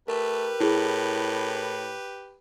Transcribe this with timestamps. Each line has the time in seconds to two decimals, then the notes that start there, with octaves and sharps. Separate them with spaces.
0.08 A3 G4 A#4 B4
0.60 A2 E4 G#4